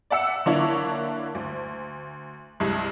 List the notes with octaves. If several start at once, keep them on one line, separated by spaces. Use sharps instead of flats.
D5 E5 F#5 E6 C#7
D3 A#3 D4 E4 C#5
D2
C2 G2 G#3